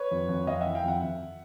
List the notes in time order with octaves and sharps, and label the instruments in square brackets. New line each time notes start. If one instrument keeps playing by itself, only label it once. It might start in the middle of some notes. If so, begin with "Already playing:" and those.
Already playing: [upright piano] B4 C#5
[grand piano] F2
F2
[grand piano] F2 [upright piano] D#5 F5
[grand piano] E3 [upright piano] E5 F#5
[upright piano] F5 G5
[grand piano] F2 [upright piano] E5 F#5
[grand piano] F2